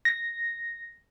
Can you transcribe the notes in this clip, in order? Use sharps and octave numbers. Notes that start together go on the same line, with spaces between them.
A#6